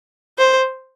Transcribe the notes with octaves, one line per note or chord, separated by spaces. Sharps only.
C5